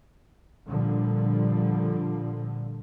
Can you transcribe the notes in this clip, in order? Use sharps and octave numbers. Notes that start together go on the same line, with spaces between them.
A#2 D3 F3 G3